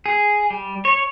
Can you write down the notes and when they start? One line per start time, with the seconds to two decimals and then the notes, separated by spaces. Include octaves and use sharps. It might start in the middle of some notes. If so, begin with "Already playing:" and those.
0.06 G#4
0.50 G3
0.85 C#5